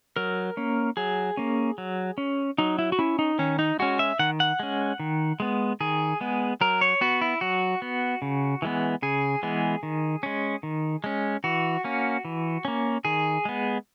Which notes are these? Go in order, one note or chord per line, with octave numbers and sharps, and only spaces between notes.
F#3 A#4
A#3 C#4
F#3 G#4
A#3 C#4
F#3
C#4
F#3 D#4
E4
F#4
C#4 E4
D#4
D#3 C#4
D#4
G#3 C#4 F#4
E5
D#3 F#5
F#5
G#3 C#4
D#3
G#3 B3
D#3 G#4
G#3 B3
F#3 A#4
C#5
B3 F#4
E4
F#3 F#4
B3
C#3
E3 G#3 B3
C#3 G#4
E3 G#3 B3
D#3
G#3 C#4
D#3
G#3 C#4
E3 F#4
A#3 C#4
E3
A#3 C#4
D#3 G#4
G#3 B3